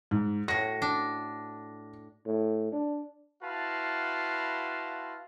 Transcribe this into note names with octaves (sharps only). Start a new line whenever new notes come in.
G#2
A2 F#4 A#6
D4
A2
D4
E4 F#4 B4 F5 A5 C6